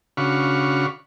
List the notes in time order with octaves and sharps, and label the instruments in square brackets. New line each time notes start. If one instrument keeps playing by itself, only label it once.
[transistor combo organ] C#3 D4 F#4 F5 B5 C#6